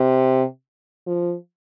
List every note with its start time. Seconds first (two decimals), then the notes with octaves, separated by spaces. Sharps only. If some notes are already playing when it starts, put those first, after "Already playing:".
Already playing: C3
1.07 F3